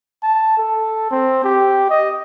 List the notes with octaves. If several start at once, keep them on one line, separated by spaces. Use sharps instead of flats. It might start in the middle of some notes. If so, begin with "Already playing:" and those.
A5
A4
C4
G4
D#5